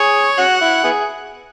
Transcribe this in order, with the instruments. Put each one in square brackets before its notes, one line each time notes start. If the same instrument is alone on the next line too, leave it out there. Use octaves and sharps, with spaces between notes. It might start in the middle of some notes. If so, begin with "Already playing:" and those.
Already playing: [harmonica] G#4 [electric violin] C#5
[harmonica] C#4 F#4 [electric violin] F#5
[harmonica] E4
B3 E4 G#4